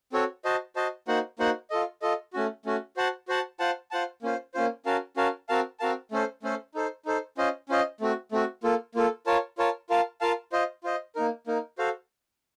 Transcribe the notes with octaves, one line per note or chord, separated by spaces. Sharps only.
C4 F#4 A4 C#5
F#4 C5 D#5 A5
F#4 C5 D#5 A5
A#3 D#4 F#4 C5 F#5
A#3 D#4 F#4 C5 F#5
F4 A4 D#5
F4 A4 D#5
A3 C#4 F#4
A3 C#4 F#4
F#4 C5 F#5 A5
F#4 C5 F#5 A5
F4 C5 F#5 A5
F4 C5 F#5 A5
A#3 C#4 F4 C5
A#3 C#4 F4 C5
C#4 F#4 A#4 F5 A5
C#4 F#4 A#4 F5 A5
C4 F#4 A#4 F5 A5
C4 F#4 A#4 F5 A5
A3 C#4 A4 C5
A3 C#4 A4 C5
D#4 A4 C5
D#4 A4 C5
C#4 F4 C5 D#5
C#4 F4 C5 D#5
A3 C4 F#4
A3 C4 F#4
A#3 F4 A4
A#3 F4 A4
F4 A#4 C#5 A5
F4 A#4 C#5 A5
F4 A#4 F5 A5
F4 A#4 F5 A5
F4 C5 D#5
F4 C5 D#5
A#3 D#4 A#4
A#3 D#4 A#4
F#4 A4 C5 F5